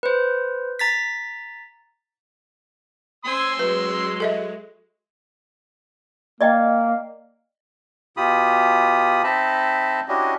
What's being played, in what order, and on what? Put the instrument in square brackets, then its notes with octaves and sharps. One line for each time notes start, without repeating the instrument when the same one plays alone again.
[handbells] B4 C5
A#5 A6 B6
[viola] C5 G#5 [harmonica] C6 E6
[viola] F#3 G#3 [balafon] B4
[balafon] A4 D#5 E5
[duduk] A#3 [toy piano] D5 D#5 G5
[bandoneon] B2 F4 G4 B5 D#6
C4 D#4 D#5 E5 A5 B5
C#4 D4 E4 F#4 G4 D#5